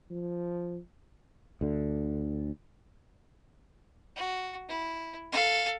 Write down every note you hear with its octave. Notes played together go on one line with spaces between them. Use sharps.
F3
D2 D3
F#4
E4
A4 F5